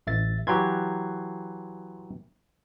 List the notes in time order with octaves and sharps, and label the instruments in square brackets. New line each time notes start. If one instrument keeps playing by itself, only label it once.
[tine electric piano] A1 E5 A6
[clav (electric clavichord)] E3 F#3 G4 [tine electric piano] C6 G#6